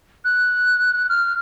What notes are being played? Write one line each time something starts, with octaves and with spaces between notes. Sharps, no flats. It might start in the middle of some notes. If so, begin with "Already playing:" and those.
F#6
F6